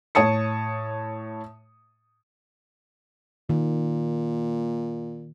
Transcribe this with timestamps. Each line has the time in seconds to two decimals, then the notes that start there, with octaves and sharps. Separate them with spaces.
0.15 A2 C#5 A5 D#6 C#7
3.49 A#2 D#3